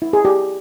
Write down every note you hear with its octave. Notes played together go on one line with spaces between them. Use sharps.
E4
G#4
G4